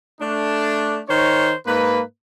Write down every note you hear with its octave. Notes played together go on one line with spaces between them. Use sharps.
A3 D4
D#3 D#4 C5 C#5
G#2 A#3 B4